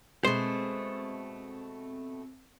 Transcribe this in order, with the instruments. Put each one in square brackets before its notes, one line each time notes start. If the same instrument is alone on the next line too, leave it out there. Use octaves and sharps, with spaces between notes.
[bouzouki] B2 A3 [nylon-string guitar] G#3 [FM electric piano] C4 [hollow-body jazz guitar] C5